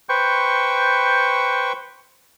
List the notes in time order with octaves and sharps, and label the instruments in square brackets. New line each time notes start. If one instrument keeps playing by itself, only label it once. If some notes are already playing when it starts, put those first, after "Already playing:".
[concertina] B4 C5 G5 C#6